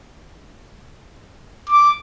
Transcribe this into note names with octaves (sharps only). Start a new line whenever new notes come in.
D6